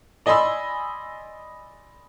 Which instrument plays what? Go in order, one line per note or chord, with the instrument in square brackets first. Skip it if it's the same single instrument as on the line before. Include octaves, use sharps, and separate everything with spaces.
[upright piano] D5 D#5 G#5 B5 C6 E6